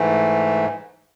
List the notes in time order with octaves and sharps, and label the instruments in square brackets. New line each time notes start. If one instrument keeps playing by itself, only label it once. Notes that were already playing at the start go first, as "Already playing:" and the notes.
Already playing: [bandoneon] G#2 E3 A3